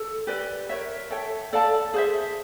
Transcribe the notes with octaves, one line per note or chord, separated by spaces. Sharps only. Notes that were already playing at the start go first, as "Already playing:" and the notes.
Already playing: A4
G4 B4 D5 G5
A#4 C#5 E5
A4 C#5 E5 G5
A4 D5 F5 A5
G#4 C5 E5